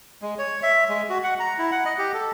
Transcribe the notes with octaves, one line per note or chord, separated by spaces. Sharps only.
G#3
C#5
E5
G#3
F#4
F#5
A#5
E4
F#5
D#5
G4
A4